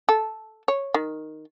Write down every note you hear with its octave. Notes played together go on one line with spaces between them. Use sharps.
A4
C#5
D#3